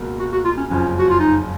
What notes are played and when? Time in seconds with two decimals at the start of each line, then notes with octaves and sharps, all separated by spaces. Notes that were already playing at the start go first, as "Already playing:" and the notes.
Already playing: C#2 B2 A#3
0.20 F#4
0.32 F#4
0.45 F4
0.57 C#4
0.70 F#1 F2 F3 C#4
0.99 F#4
1.10 F4
1.20 D#4